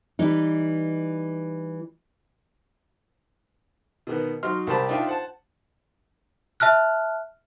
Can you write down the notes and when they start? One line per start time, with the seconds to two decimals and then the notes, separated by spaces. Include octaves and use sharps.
0.19 E3 G3 D#4
4.07 B2 D#3 B3
4.43 F#3 D#4 C6 F6
4.67 C2 G4 A#4 C5 A5 B5
4.89 D4 D#4 F4 E5 F5 G5
5.07 C5 F#5 A5
6.60 E5 A5 F6 F#6